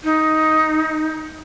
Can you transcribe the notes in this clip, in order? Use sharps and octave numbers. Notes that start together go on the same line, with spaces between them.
D#4